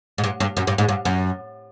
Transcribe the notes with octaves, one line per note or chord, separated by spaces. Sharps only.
G#2
G2
G2
F#2
G2
G#2
G2
F#2